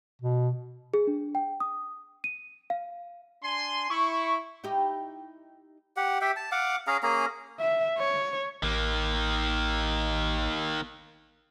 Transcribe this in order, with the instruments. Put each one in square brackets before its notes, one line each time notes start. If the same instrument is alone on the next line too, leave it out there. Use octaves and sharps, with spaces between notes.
[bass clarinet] B2
[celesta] G#4
D4
G5
D#6
D#7
F5
[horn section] D4 G#5 C6
[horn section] E4 [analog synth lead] C#6
[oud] D#4 E4 G4
[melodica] G4 F#5
G4 E5 G5
A5
F5 F#5 D6
C#4 G#4 F5 A#5
A#3 C#4 G#4 A#5
[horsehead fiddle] E5
C#5
[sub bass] A1 [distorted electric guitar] D#3 A#3